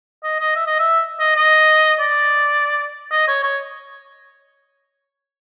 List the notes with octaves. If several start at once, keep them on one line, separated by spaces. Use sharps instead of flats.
D#5
D#5
E5
D#5
E5
D#5
D#5
D5
D#5
C#5
C#5